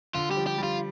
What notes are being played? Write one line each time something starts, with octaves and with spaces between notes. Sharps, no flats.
D3 F4
G3 G4
F3
G4
G3
F4